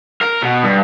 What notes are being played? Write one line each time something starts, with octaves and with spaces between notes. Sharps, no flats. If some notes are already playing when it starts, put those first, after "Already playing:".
A#4
B2
G2